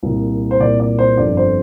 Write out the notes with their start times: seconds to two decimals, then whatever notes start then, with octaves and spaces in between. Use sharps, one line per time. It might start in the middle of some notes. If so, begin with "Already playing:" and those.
0.03 C2 A#2
0.51 C5
0.60 C2 A#2 D5
0.80 D5
0.99 C5
1.17 G1 F2 D3 D5
1.37 C5